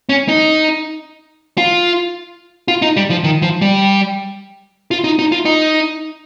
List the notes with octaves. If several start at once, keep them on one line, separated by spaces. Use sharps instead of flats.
C#4
D#4
F4
F4
D#4
G3
F3
D#3
F3
G3
F4
D#4
D#4
F4
D#4